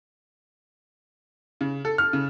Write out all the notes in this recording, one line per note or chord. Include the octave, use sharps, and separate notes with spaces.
C#3
A4
F6
C#3